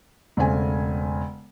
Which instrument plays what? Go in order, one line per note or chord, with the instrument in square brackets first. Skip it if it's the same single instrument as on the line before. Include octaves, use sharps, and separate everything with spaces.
[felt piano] E1 C#3 A3 C4 G#5